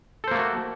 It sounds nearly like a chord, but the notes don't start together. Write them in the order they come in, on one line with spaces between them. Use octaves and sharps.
A4 C5 A#3 A3 F#4